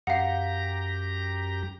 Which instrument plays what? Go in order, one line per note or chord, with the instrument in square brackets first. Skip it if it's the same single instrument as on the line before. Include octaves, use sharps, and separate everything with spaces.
[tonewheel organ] F#2 G4 A#5 [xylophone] F5 F#5